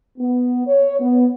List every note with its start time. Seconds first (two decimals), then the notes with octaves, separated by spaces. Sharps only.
0.18 B3
0.66 C#5
0.99 B3